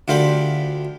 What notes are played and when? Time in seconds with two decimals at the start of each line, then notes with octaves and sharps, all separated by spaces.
0.08 D2 D3 F4 G4 B5